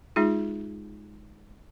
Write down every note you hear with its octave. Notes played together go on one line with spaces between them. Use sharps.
G#3 D#4 F4 G#4